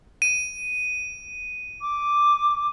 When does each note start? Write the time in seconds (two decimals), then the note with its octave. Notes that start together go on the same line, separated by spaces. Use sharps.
0.22 D#7
1.81 D6